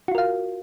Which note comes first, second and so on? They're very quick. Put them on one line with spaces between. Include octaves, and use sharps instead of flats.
F#4 F4 A#4 F5